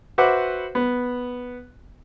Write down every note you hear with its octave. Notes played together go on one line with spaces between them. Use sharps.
F#4 B4 C5 E5 F#5 D6
B3